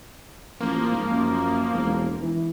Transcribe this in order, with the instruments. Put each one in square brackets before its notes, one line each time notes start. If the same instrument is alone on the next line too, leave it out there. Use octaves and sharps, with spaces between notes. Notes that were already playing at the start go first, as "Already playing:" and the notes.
[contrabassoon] A1 [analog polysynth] F3 A#3
[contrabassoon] G#2
F#2
E1
E3